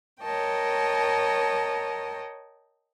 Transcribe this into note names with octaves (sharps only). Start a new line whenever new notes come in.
A#4 C#5 D#5 G5 A5